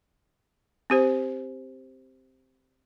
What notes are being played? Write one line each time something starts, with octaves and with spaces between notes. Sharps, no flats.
C4 G4 C5